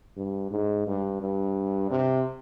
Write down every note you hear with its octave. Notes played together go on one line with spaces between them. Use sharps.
G2
G#2
G2
G2
C3